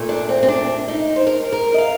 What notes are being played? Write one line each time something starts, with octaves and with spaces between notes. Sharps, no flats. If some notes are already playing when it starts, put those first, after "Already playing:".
Already playing: A#2 A3
D4
C4
C4
D4
D#4
C5
A#4
A#4
D#5
F5